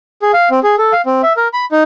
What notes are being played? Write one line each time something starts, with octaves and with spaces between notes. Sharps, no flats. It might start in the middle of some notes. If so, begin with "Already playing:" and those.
G#4
F5
C4
G#4
A4
F5
C4
E5
A#4
B5
D#4